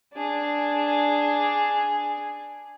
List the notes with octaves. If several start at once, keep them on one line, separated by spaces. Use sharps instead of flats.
D4 G#4